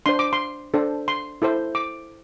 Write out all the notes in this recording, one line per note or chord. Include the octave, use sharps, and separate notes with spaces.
D4 C5 C6
D6
C6
D4 A4 C5
C6
E4 A4 C5
D6